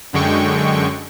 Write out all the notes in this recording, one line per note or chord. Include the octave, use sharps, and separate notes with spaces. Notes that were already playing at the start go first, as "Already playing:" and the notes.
F#2 D3 G#3 G5 C#6